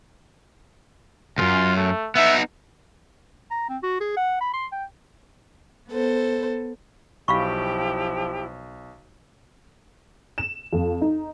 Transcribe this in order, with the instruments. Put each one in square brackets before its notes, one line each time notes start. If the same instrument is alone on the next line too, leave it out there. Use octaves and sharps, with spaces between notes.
[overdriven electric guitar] C#2 F#2 [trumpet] F4
[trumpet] A3
[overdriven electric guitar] B3 D#4 [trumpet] E5
[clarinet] A#5
C4
F#4
G#4
F#5
B5
C6
G5
[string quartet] B3 A4 C5
[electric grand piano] B1 [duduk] F3 [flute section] E4 G4 G5 [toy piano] F5 B5 C#6
[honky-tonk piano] E7
F2
D#4